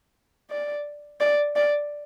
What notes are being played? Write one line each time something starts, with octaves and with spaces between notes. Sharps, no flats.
D5
D5
D5